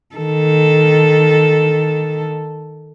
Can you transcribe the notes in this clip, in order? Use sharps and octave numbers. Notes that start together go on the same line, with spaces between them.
D#3 A4